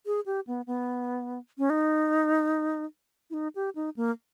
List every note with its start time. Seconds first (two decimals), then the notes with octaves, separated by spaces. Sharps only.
0.06 G#4
0.26 G4
0.47 B3
0.67 B3
1.58 C#4
1.70 D#4
3.30 E4
3.34 D#4
3.55 G4
3.75 D#4
3.96 A#3